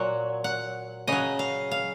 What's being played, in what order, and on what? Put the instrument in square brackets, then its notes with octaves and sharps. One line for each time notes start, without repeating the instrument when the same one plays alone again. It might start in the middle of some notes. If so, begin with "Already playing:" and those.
Already playing: [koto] A#2 F#3 F#5
F#5
C#3 F#3 D#5
F5
F5